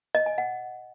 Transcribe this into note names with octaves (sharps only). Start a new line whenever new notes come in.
D#5
G#5
F#5